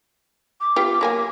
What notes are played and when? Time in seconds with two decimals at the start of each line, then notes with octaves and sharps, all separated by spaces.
0.61 D6
0.76 B3 F4 G4
1.01 F#3 A#3 G#5